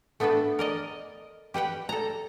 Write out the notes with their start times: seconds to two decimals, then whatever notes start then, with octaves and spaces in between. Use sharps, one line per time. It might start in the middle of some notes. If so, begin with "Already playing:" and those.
0.20 A3 B3 D4 A4 B4
0.59 A#4 D5 D#5
1.54 G4 B4 F#5 G5
1.89 A4 A#5